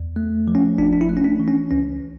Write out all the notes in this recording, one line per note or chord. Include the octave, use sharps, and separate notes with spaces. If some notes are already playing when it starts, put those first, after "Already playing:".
Already playing: E2
A3
F3
C#4
G1 D4
D4
E4
A3
C#4
D4
E3
C#4
C#2 C#4